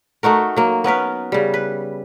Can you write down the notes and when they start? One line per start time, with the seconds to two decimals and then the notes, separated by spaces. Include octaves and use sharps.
0.23 A3 D#4 F#4 A#4
0.56 F#3 A#3
0.84 B3 C#4 A#4 B4
1.32 C#3 G3
1.54 B4